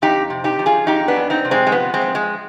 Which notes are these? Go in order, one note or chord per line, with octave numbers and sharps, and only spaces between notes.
F2 D#4 G4
C3
D#4 G4
F3
F4 G#4
F2 D#4 G4
B3 D4
F2
C4 D#4
C3
G#3 C4
G#3
F3 B3
G#3 C4
F3
G#3